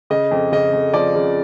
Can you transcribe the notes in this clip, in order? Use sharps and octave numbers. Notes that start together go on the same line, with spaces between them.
C#3 D#5
F2
C#3 D#5
F2
F3 D5
C#3